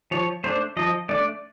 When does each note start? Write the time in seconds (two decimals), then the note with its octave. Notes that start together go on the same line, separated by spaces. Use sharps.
0.11 F3 C#5
0.44 A3 D4 C5
0.77 F3 D#5
1.09 A3 D4 D5